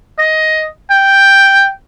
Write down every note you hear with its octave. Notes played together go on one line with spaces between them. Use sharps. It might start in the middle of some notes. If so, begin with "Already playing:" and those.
D#5
G5